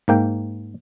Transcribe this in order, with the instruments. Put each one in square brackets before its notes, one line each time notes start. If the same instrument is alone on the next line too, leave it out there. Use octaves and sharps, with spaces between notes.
[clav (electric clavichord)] G#2 A#3 G5